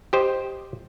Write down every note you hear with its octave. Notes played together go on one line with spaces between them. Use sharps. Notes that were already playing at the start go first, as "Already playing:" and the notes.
G4 C5 D#5